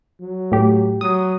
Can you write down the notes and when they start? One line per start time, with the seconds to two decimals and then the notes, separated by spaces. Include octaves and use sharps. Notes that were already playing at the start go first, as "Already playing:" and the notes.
0.21 F#3
0.52 A2 G4
1.01 F#3 D#6